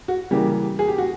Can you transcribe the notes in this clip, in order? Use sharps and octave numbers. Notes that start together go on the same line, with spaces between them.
F#4
C#3 E3 G3 A#3 G4
G#4
G4
F#4